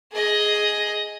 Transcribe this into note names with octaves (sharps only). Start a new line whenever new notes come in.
G#4 D#5